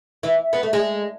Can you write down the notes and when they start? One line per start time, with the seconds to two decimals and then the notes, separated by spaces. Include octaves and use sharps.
0.23 E3
0.53 B3
0.63 A3
0.73 G#3